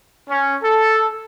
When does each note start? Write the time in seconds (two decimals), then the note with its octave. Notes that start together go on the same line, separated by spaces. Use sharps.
0.29 C#4
0.62 A4